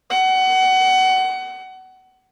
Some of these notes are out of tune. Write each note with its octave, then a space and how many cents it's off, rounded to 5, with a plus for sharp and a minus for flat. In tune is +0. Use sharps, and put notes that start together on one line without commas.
F#5 +25